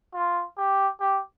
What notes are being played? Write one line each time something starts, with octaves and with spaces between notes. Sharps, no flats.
F4
G4
G4